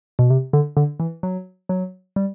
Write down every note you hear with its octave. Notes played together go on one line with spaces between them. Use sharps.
B2
C3
D3
D3
E3
F#3
F#3
G3